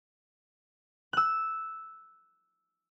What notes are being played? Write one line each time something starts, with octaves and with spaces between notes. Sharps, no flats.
E6 F#6